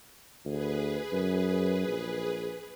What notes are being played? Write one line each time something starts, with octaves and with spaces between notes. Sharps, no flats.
D2 G#4 B4
F#2
A#1